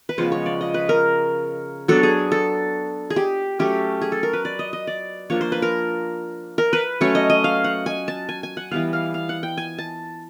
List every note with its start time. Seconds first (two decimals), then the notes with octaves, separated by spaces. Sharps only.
0.09 B4
0.18 C#3 F3 G#3 B3 C5
0.32 C#5
0.46 D5
0.61 D#5
0.74 B4
0.89 A#4
1.88 F#3 B3 D4 A4
2.03 G#4
2.32 A4
3.10 G#4
3.16 G4
3.59 F#3 A3 C#4 G4
4.01 G#4
4.12 A4
4.23 A#4
4.33 B4
4.45 D5
4.59 D#5
4.73 D#5
4.87 D5
5.30 F3 A#3 D4 C#5
5.41 C5
5.52 B4
5.62 A#4
6.58 A#4
6.73 B4
7.01 F#3 A3 C#4 C#5
7.15 D#5
7.30 D#5
7.44 F5
7.64 F#5
7.86 G#5
8.08 A5
8.29 G#5
8.43 G#5
8.57 F#5
8.71 E3 G3 B3 F5
8.93 F5
9.14 F5
9.29 F#5
9.43 G5
9.57 G#5
9.78 A5